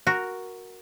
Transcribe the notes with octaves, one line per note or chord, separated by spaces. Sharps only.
F#4 A#4